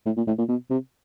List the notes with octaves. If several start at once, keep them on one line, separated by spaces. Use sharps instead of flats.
A2
A#2
A2
A#2
B2
C3